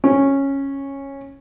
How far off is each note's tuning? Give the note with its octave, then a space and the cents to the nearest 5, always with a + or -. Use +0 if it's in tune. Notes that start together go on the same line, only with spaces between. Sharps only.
C#4 -10